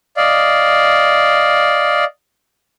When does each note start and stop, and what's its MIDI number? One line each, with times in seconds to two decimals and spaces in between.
0.17 2.04 74
0.17 2.04 75
0.17 2.04 77